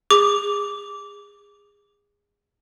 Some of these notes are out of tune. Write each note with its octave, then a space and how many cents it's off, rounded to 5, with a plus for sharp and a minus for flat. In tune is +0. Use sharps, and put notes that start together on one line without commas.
G#4 -25 D6 -15